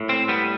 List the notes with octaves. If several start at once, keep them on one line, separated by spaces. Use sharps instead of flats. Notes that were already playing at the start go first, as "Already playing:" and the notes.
Already playing: A2
C4
G3 B3